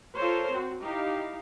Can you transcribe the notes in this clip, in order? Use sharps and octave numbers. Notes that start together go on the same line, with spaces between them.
F4 A4 A#4 C5 C#5
C4 F#4
D#4 E4 G4 F5